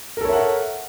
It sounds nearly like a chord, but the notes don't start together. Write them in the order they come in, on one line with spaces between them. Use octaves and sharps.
A#4 A4 C#5 E5 F#5